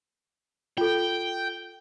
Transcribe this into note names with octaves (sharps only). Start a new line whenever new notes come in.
F4 A4 G5